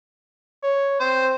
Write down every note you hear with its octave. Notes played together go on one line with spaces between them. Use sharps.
C#5
C4 C5